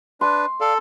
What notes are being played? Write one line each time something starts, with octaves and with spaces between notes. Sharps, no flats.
D4 B4 C6
A4 D5 F5